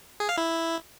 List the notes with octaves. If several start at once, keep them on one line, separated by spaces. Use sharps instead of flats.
G#4
F5
E4